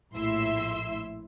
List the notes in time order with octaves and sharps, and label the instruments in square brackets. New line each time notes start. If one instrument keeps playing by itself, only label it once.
[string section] A#1 A2 E4 E5 C6 E6